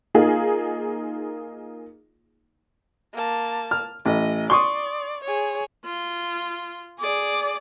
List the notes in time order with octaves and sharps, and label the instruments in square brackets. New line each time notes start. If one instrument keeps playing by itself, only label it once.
[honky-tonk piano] A#3 D#4 F4 G#4
[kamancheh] A#3 A5
[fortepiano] F6
[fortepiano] A1 [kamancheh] D#5
[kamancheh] D5 [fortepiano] C6 C#6 D#6
[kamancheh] G#4 C#5
[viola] F4
G#4 D5